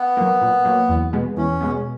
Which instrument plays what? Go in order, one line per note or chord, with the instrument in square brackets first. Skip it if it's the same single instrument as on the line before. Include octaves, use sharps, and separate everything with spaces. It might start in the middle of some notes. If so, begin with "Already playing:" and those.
Already playing: [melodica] B3
[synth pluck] F#3 A#3
A#2
F#3 A#3
E2
B2 G#3 B3
[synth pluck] E2 [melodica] C#4
[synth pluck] B2 G#3 B3